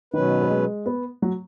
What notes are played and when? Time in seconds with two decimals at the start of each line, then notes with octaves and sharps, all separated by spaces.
0.13 B2 D#3 F#3 C#4 B4
0.42 B3
0.50 G#3
0.86 B3
1.22 F#3